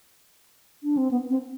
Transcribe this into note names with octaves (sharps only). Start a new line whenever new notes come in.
D4
C4
B3
C4